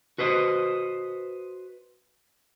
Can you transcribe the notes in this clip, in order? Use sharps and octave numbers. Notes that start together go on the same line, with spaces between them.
F#4 B4 C5 D#5